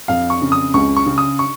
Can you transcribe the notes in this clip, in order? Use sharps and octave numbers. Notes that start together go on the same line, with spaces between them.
F2 F5
C#6
C#3
D#6
C#2 C#6
C#6
C#3
D#6
C#6